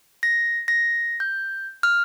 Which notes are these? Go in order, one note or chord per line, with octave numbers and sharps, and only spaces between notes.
A#6
A#6
G6
F6